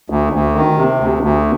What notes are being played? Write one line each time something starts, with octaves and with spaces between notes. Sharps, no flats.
D2
D2
D#3
C3
D2
D2